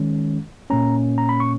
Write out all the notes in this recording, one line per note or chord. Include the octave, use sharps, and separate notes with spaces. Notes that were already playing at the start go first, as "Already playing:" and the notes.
Already playing: D#3 G#3 C#4
A#2 A#3 C#4 A#5
A#5
B5
C#6